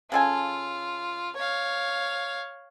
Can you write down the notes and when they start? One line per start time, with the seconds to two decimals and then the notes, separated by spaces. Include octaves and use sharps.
0.12 C#3 F4 A4 G#5
1.36 C#5 F5